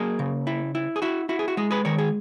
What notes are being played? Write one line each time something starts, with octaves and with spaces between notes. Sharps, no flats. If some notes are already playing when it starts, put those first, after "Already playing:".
Already playing: F#3 A#3 G#4
C#3
E4
E4
G#4
E4 F#4
E4 F#4
G#4
F#4
G#3 G#4
G#4 B4
D#3 A#4 C#5
G#4